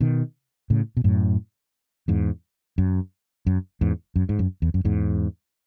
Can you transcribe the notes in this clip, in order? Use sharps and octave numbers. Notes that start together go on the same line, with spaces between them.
B2 D#3
A2 C#3
B2
F#2 A2
E2 G#2
F#2
F#2
E2 G#2
F#2
G#2
F#2
E2
F#2
E2 G#2